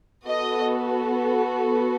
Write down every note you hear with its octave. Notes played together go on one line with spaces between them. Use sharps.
B3 F#4 A4 D#5